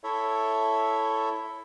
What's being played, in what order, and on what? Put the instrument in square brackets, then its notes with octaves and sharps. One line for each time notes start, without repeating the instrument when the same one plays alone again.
[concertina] E4 A4 C#5 E5